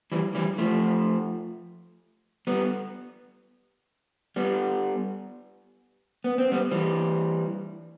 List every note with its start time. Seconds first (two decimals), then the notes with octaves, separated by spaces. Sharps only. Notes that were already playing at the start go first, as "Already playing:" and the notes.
0.12 E3 G3
0.35 E3 G3
0.58 F3 A3
2.47 G3 B3
4.36 G3 B3
6.24 B3
6.38 C4
6.52 G3 B3
6.71 E3 G3